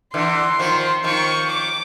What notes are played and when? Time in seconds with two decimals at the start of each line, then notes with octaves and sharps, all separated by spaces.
0.14 D3 E3 C6
0.59 D#3 F3
1.04 D#3 F3 C#6
1.50 D6